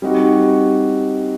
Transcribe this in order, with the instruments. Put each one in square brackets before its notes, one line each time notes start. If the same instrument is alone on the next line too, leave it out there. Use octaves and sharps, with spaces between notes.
[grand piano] G3 C4 D#4 F#4